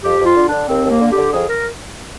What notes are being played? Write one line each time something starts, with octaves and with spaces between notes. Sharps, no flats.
F2 G4
F2
F4
D3
D4
D3
D#2 C4
D#2
A#3
D3
G4
D3
F2 G#4
A#4